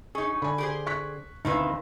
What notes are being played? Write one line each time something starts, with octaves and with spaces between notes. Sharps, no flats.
C#4 D#4 G#4
D3 G#5 B5
G4 G#4 C5
C#6 F#6 B6
D2 B2 D#3 C4 D#4 E4 B4 F5